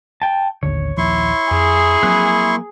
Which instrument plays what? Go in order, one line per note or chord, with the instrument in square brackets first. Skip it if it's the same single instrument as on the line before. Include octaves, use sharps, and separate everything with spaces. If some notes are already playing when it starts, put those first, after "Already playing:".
[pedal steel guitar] G5 A5
[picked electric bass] A1 D#2 D3 [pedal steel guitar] C#5
[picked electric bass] A#1 D#2 F3 [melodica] E4 C6 C#6
[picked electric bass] F2 [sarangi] G#4
[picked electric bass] F3 F#3 C4 [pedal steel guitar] A#3 B5 F#6